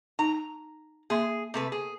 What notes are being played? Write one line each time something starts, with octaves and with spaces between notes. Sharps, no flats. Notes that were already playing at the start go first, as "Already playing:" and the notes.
D#4 A#5
A#3 G#4 E5 C6
C3 A3 B4
G#4